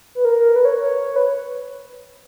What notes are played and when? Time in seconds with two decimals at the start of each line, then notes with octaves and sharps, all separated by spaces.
0.15 B4
0.25 A#4
0.56 B4
0.65 C#5
0.76 C#5
1.16 B4